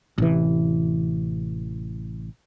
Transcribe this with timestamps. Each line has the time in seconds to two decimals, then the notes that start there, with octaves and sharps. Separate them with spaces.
0.18 A1 C3 E3